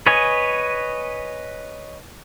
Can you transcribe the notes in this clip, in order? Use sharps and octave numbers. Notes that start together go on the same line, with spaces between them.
B4 C#5 D#5 G#5